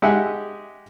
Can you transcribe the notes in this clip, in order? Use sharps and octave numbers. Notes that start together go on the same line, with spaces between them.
G#3 G4 G#4 E5 F#5